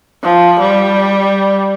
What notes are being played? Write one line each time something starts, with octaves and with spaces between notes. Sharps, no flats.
F3
G3